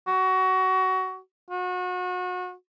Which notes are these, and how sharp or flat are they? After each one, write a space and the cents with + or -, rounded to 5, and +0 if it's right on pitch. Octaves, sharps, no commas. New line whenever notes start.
F#4 +20
F#4 -35